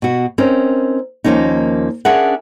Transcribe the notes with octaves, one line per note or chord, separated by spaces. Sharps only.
B2 F#4
C4 C#4 D#4 A#4
D#2 F3 A#3 C#4 D#4
C#4 D4 G#4 A#4 E5 F#5